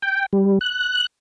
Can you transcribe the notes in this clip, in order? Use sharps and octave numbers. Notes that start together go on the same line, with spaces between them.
G5
G3
F#6